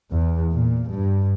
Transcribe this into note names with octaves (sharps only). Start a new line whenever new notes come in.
E2
A#2
G2